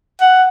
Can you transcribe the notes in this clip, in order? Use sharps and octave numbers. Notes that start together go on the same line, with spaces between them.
F#5